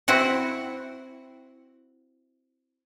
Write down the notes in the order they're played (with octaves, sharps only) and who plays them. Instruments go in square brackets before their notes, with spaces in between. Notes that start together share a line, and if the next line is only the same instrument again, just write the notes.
[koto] C4 E4 F#4 F#5